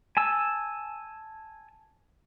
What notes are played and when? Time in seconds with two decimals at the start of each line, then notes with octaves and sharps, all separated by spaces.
0.17 G#5 A5 E6